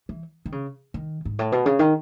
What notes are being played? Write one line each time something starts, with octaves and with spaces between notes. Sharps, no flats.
E3
D#3
C#3
D#3
G#2
A2
B2
C#3
D#3